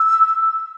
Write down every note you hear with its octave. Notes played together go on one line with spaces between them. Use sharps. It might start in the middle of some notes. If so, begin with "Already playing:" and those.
Already playing: E6